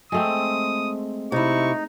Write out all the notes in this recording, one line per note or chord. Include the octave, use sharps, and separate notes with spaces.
G#3 A3 C4 D#6
C3 D#4 E4 C#6